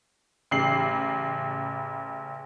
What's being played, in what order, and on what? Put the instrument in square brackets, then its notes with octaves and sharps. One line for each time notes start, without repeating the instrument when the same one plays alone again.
[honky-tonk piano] A1 C#3 C7 F#7